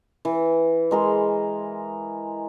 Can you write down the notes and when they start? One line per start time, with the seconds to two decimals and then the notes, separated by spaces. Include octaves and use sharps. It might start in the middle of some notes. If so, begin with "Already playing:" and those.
0.25 E3
0.91 G#3 A#4 C6